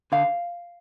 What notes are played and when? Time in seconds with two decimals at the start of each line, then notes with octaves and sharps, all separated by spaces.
0.12 D3 F5